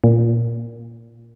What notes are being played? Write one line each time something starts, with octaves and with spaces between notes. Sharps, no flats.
A#2